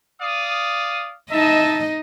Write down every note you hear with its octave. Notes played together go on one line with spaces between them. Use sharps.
D5 F5 D#6
D#4 E4 D#5 E5 A5